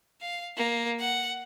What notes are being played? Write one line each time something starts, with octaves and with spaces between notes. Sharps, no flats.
F5
A#3
F#5